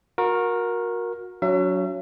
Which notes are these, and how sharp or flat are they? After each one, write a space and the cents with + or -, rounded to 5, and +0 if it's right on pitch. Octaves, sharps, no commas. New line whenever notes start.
F#4 -30 A#4 +10
F#3 +0 D4 -45 E5 +40